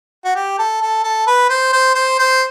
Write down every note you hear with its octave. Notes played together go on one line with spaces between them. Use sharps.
F#4
G4
A4
A4
A4
B4
C5
C5
C5
C5